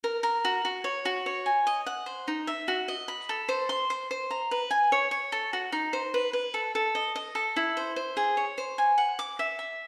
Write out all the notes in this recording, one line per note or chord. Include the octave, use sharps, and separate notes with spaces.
A#4
A#4
F#4
F#4
C#5
F#4
C#5
G#5
D#5
F#5
C5
D#4
E5
F#4
D#5
B5
A4
C5
C6
C5
C5
A#5
B4
G#5
C#5
C#5
A4
F#4
D#4
C5
B4
B4
A4
A4
D#5
D#5
A4
E4
C5
C5
G#4
C#5
C5
G#5
F#5
D6
E5
E5